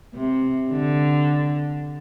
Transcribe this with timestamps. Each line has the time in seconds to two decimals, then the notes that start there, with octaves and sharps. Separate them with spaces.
0.14 C3
0.70 D3